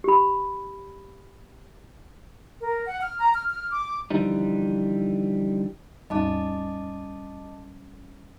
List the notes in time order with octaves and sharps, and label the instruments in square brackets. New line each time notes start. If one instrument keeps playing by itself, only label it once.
[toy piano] G4 B5
[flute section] A#4
F#5
F6
A#5
F6
F6
D6
[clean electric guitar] D3 E3 F3 G3 D#4
[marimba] D#2 G#2 D#4 [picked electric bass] G3 C#4 [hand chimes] D#5 A5 D6